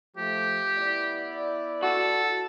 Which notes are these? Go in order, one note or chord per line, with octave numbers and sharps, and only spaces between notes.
F3 A3 G4
B3 E4 D5
F#4 A4